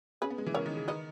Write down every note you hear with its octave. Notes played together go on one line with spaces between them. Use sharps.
C#4 G#4 B4
B3
G#3
E3
C#3 A#4 C#5
D#3
C#3
D#3 B4 D#5